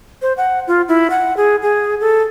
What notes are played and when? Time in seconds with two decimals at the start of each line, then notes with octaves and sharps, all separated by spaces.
0.22 C5
0.37 F#5
0.67 F4
0.88 E4
1.10 F#5
1.37 G#4
1.62 G#4
2.01 A4